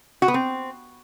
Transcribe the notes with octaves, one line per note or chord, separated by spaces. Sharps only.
F#4
B3
C4